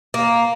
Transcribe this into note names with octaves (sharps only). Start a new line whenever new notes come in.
A#3